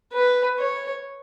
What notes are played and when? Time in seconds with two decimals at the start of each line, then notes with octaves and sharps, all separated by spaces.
0.12 B4
0.58 C#5